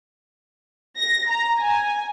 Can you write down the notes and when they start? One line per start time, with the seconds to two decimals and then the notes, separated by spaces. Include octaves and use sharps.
0.97 A#6
1.29 A#5
1.59 G#5